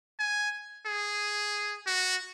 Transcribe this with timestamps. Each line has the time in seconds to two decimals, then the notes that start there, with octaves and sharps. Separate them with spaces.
0.19 G#5
0.86 G#4
1.87 F#4